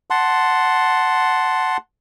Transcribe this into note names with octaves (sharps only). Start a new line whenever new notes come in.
F#5 A5 C6